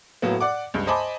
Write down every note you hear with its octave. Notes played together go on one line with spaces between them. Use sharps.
A2 F#3 A#3 B3
D5 F#5 D6
C#2 G2
C5 D#5 G#5 A5 B5 D6